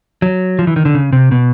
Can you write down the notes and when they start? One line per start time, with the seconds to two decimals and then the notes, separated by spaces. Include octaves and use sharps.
0.22 F#3
0.59 F3
0.67 E3
0.76 D#3
0.85 D3
0.95 C#3
1.13 C3
1.31 B2